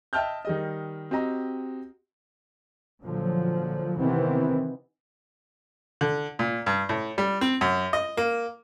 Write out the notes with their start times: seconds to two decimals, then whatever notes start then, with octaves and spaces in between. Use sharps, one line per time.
0.13 D#5 E5 G5 A5 F6 G6
0.45 D#3 G3 D#5
1.11 C4 F#4 G4 D#5 A#5
3.01 A#2 D3 F3 F#3
3.98 C3 D#3 E3 B3 C4
6.01 D3
6.39 A#2
6.66 G2
6.89 A2
7.18 G3
7.41 C4
7.61 F#2
7.93 D#5
8.17 A#3